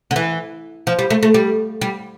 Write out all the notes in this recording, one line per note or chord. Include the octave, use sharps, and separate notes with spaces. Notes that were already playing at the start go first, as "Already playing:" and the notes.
D3
E3
F3
G3
A3
A3
G3
G3